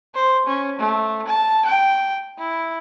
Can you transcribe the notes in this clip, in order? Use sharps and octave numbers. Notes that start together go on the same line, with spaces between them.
C5
C#4
A3
A5
G5
E4